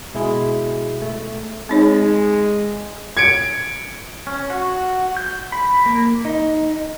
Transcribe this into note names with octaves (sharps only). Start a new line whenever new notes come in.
B2 G#3 E4 G#4
A3
G#3 C4 D#4 C#5
G#6 C#7 D7
C#4
F#4
G6
B5
A#3
D#4